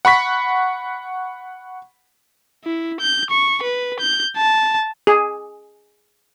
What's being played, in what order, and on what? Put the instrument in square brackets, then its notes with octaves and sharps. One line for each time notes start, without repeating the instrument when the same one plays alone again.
[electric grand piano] F#5 B5 C#6 B6
[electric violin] E4
G6
C#6
B4
G6
A5
[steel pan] G#4